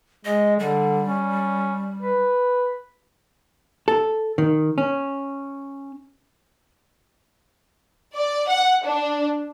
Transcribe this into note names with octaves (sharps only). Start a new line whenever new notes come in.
G#3 D#5
D3 G3
C#4
B4
A4
D#3
C#4
D5
F#5
D4